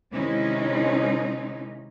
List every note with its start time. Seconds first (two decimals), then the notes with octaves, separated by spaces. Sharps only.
0.12 C3 D#3 G#3 C#4 D#4 E4